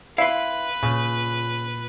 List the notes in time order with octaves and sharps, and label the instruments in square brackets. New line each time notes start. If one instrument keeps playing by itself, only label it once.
[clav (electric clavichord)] E4 [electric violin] B4 [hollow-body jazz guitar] F5 C6
[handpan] A#2 [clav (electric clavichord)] C#3